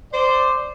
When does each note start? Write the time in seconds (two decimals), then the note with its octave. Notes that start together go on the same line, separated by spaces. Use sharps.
0.13 C5 D5